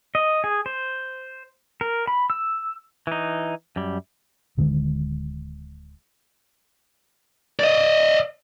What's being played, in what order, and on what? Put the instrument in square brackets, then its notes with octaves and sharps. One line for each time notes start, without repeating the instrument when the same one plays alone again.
[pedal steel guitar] D#5
G#4
C5
A#4
B5
E6
[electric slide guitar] E3 D#4
F#2 G3
[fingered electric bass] D1 D3 D#3 G#3
[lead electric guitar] D5 D#5